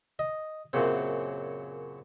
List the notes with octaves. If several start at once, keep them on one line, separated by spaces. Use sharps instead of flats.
D#5
F#2 A#2 C#3 C4